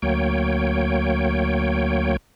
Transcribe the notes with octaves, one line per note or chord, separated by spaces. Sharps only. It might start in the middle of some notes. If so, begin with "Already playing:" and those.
D2 F#3 A#3 C#5 G5